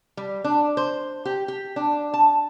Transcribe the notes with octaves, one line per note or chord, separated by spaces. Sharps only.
G3
D4
C5
G4
G4
D4
A5